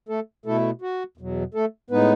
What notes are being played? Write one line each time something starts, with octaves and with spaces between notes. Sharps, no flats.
A3 A4
B2 A3 E4 A4
F#4
E2 B2 F#3
A3 A4
A2 G#3 B3 D#4 B4